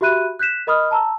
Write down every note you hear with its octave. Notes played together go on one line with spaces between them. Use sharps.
F#4 G4 E5 B5 F#6 D#7
F#6 G6 B6 E7
A#4 D#5 B5 D#6 F6
A5 A#5 E6